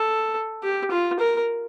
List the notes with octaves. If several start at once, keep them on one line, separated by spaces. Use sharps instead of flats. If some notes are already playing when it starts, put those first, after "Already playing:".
Already playing: A4
G4
F4
A#4